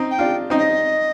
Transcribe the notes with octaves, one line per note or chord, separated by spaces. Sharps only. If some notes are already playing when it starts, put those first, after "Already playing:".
Already playing: C4 D#4
G5
D4 F4
C4 D#4
D#5